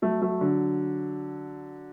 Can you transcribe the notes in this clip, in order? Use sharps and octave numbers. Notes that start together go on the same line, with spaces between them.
F#3 A3
F#3 A3
D3 F#3